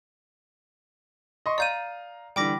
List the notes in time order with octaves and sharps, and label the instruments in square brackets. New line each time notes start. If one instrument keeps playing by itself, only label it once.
[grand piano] D#5 C6 C#6
[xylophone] D5 G6 D#7 [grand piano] F5 A#5
[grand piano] D3 E3 G3 [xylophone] G5 D6 A#6